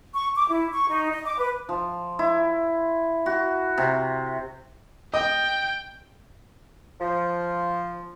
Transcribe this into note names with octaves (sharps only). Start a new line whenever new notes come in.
C#6
D6
E4
C#6
D#4
D#5
D6
B4
F3
E4
F#4
C3
D#5 G5
F3